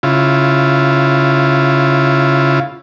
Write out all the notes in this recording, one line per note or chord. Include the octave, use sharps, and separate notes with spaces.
C#3 E4 F4